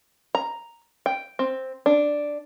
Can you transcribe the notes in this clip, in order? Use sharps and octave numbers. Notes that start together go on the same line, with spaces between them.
A#5
G5
C4
D4